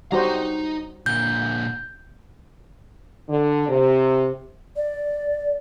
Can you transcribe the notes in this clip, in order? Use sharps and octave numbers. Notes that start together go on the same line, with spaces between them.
G3 D#4 F#4 C5 A#5
A#2 D3 G6
D3
C3
D5